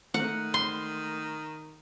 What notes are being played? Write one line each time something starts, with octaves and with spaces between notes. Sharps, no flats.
D#3 A3 F#5
C6